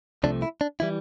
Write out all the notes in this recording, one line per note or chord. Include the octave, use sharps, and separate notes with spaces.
C2 C3 F3 A3 D4
E4
D4
E3 G3 E4